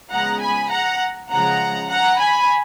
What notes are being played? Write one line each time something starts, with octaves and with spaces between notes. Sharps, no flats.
C#3 F3 G#3 B3 F#5 A#5
G#5 B5
F#5 A#5
C#3 F3 G#3 F#5 A#5
F#5 A#5
G#5 B5